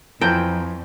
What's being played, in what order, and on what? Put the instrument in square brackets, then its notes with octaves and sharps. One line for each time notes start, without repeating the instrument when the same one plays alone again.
[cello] F2 [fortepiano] E3 F3 [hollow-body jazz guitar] A4 A5 A#5 [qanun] G5